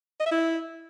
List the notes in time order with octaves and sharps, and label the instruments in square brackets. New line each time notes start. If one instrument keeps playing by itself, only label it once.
[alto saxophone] D#5
E5
E4